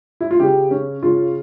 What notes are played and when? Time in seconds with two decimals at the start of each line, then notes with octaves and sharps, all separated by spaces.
0.21 E4
0.31 F4
0.40 C#3 G4
0.71 C#4
1.02 C#3 F4